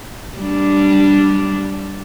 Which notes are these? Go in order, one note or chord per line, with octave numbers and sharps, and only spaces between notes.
G3 D4